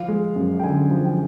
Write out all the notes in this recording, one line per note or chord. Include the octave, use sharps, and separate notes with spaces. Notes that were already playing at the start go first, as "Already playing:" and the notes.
Already playing: F3 F5
G#3
F#2
G5
D3 G#5
F3
G5